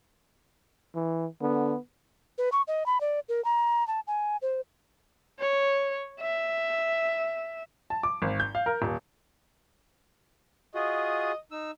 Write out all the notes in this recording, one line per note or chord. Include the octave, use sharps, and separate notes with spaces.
E3
D3 B3
B4
C#6
D#5
B5
D5
A#4
A#5
A5
G#5
C5
C#5
E5
A5
D6
G#1
G6
F5
A#4
D#1
F4 F#4 G#4 D#5
D#4 E6